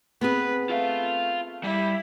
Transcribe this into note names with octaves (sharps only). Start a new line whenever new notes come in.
B3 C4 G#4 B4
A3 F4 F5
G3 E4